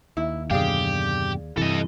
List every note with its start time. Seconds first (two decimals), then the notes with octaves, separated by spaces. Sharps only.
0.17 D#2 E4
0.51 F#2 B2 D3 G4 G#4 D5 F5
1.58 G2 C3 E3 A4 D#5